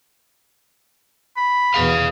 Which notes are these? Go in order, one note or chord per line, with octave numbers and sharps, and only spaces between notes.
B5
E2 B2 G#4 F5